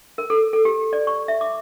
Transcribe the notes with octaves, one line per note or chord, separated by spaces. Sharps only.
A#4
A4
A4
G4
D5
C#6
E5
D6